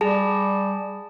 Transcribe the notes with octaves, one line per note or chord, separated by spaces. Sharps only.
G3 G#4 A5